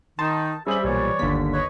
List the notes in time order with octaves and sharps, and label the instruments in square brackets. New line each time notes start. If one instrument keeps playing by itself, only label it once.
[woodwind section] D#3 D#4 [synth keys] A5 [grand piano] C6
[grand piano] G3 C5 F#7 [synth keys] C#4 G#4 [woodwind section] G4 E5
[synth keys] B1 A#2 [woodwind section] E3 C#5 D5
[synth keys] G1 B6 [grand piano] D#2 D3
[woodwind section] B4 C#5 D#5